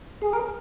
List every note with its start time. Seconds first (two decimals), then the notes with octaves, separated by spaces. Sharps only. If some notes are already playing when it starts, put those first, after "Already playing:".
0.22 G#4
0.33 A#4